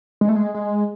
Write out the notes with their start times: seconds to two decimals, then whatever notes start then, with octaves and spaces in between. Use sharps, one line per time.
0.21 G#3
0.29 A3
0.36 G#3
0.54 G#3